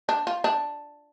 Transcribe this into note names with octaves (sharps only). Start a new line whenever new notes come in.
D4
F4
D4